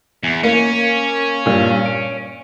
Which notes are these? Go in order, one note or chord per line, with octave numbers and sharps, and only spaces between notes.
E2
A#3 C#4
G2 A#2
D7